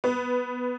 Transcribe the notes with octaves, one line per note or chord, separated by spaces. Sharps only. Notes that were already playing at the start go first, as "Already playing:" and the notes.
B3